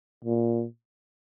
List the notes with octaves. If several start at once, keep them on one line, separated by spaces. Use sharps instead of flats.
A#2